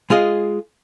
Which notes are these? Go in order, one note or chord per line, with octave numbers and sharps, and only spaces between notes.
G#3 F4 G#4 D#5